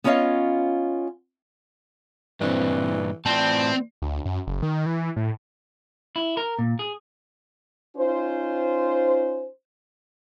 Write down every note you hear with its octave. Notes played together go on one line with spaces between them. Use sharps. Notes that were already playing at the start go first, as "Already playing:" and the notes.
B3 C#4 F4 C#5 D#5 F5
G2 A#2 E3 C4 D4
A2 E3 C4 F4 D5 G5 A5
D2
F#2
F#1
D#3
E3
A2
E4
A#4
A#2
G#4
C#4 D#4 F4 C5